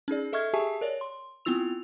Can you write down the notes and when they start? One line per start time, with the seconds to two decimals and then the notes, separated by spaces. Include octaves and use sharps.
0.08 C#4 D#4 G#4 D5
0.33 A4 D#5 E5 C#6 F6 G#6
0.53 G4 G#4 E5 G#5 A5 C#6
0.81 A#4 C#5 D5
1.01 C6
1.45 B3 C4 E4 F4 E6 F7